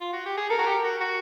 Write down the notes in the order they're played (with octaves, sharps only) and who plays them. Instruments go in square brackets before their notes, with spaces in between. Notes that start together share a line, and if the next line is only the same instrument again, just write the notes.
[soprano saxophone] F4
F#4
G4
G#4
[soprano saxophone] A4 [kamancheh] A#4
[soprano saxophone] F#4
G4
F#4
F#4